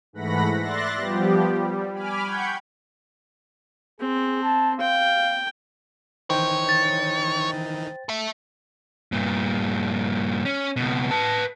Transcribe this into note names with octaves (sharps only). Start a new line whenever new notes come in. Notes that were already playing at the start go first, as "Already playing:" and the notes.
G#2 E3 A3 F#5 B5 A#6
D5 E5 C6 F#6 A6 A#6
F3 G3 B3 G4
G3
G#5 B5 D6 F6
F#5 G5 B5 C#6 G6 G#6
C4 G#4
A5
F5 G5
D#3 E3 D#4 C5 C#5 G5
A6
A4 E5
G2 A#2
C#4
C#2 B2
B4 A5